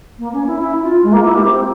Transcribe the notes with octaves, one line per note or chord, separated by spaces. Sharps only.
A#3
C#4
E4
E4
F4
G#3
A#3
E4
G4
C4